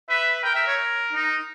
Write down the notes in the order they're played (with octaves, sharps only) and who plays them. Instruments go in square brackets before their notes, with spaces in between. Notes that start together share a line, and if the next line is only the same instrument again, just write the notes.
[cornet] B4 [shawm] E5
[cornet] A#4 [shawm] G5
[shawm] E5
C#5
D#4